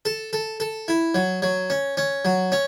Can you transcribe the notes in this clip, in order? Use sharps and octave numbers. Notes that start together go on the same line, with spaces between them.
A4
A4
A4
E4
F#3
F#3
C#4
C#4
F#3
C#4